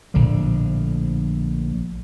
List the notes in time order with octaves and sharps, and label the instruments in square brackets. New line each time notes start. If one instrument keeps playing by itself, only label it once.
[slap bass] A#1 A2 D3 F3